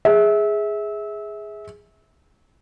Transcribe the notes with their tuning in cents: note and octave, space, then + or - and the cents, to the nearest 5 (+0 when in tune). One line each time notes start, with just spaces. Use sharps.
G#4 +0 E5 -25